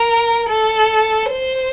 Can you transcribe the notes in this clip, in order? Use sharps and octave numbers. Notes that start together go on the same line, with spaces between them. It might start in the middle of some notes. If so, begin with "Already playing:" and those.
Already playing: A#4
A4
C5